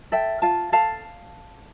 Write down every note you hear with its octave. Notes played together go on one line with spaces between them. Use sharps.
A4 E5 G5
F4 F5 A5
A4 F5 A5